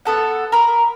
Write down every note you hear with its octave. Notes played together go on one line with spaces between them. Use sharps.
B3 A4 F#5
A#4 B5